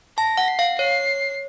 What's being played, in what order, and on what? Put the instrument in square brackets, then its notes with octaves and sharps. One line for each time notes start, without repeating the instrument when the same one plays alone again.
[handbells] A5 [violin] A#6
[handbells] F#5
[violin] C7
[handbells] F5
[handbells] C#5 [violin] C7